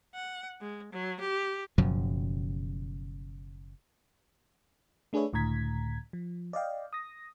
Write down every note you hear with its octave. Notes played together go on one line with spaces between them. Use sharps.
F#5
G#3
F#3
G4
F#1 F#2 B2 F3
A3 D4 G#4 B4 C#5 E5
C#2 A2 D3 A#5 G#6 B6
F3
D5 D#5 F5 G5
D#6 A#6